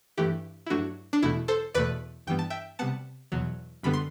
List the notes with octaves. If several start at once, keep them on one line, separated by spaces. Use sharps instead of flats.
G2 E3 A3 E4 G4
E4
G2 F#3 A3 D4 F#4
D4
E2 B2 A3 E4
A4 C5
E2 B2 A3 B4 D5
G2 E3 G3 B3 G5
A5
E5 G5
C3 G3 B3 F#5 A5
E2 B2 F#3
F#2 D3 G3 B3 B5
C6